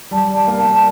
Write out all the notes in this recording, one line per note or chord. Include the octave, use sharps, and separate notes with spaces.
G3 A5
A5
A#3 D4
A5
A5